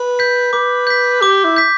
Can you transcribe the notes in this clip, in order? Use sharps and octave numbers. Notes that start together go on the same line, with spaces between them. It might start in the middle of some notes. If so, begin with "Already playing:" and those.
Already playing: B4
G6 B6
B4 D6
G6 B6
G4 D6
E4
G6 B6